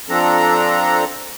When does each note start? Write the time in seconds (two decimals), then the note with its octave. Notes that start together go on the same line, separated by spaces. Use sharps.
0.09 F3 C4 D4 A4 A#5